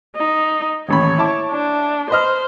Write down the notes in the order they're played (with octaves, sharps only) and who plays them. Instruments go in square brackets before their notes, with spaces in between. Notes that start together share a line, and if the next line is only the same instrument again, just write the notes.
[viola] D#4
[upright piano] D#1 A1 B5 [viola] C#5
[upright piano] E4 A5 D6
[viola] D4
[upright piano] B4 D#5 F6 [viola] C5